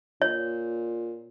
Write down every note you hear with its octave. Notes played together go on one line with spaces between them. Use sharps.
A#2 C#5